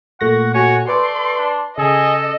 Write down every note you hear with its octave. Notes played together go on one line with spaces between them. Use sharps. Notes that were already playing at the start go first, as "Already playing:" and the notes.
A#2 A3 F#5 C#6 A#6
F#4 C#5 G#5
A3 B4 D5 C6
D4
C#3 G#4 A4 D#5